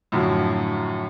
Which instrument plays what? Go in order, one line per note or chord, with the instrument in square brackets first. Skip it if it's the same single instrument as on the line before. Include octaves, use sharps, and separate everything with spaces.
[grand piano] F#2 A2 D3 F3 F#3